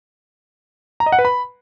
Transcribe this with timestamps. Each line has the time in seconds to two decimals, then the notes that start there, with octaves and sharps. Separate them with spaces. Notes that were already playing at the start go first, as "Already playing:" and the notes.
1.00 A#5
1.06 D#5
1.12 F#5
1.19 B4
1.25 B5